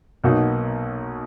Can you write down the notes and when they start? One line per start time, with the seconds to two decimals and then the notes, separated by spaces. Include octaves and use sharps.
0.24 B1 B2 A#3 D#4 F#4